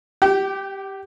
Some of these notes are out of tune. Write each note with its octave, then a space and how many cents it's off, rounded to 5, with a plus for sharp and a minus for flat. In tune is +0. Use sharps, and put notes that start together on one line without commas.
G4 +0 G5 -35